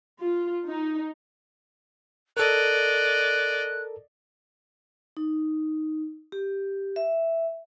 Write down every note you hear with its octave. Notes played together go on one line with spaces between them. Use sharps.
F4
D#4
A4 A#4 D5 D#5 F#6
D#4
G4
E5